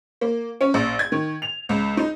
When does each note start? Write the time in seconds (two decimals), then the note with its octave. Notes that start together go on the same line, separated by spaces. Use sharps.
0.21 A#3
0.61 C#4
0.74 A#1
0.99 G#6
1.12 D#3
1.42 F7
1.69 C#2
1.97 D#4